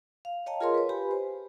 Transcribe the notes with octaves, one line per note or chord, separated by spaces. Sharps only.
F5
C#5 D#5 F5 G5 A5 A#5
F4 G#4 A#4 C#5 D#5 C6
B4 C#5
G4 B4 G#5 B5
C5